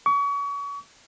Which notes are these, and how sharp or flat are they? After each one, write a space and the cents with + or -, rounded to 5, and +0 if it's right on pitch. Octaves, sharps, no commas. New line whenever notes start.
C#6 +35